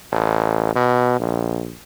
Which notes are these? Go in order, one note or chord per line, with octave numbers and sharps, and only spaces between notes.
A1
B2
A#1